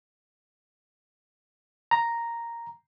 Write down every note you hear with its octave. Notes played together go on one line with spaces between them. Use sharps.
A#5